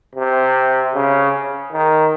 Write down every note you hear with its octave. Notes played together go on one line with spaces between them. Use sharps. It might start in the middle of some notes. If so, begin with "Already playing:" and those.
C3
C#3
D#3